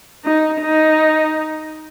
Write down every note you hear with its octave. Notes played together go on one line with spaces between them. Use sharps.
D#4
D#4